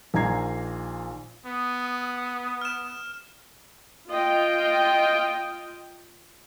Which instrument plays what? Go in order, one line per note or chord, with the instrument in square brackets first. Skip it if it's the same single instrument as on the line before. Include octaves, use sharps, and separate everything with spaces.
[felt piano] A#1 A#2 D#3 A#5 G#6 C7
[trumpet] B3 [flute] D#6
[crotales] F6 E7
[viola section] F4 D#5 G5